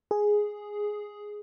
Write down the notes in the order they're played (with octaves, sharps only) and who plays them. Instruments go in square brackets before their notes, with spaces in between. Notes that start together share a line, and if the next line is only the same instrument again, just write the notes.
[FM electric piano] G#4